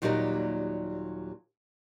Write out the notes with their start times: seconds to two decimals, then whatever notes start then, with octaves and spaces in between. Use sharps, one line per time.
0.02 D#2 A#2 F#3 G3 D#4 A#4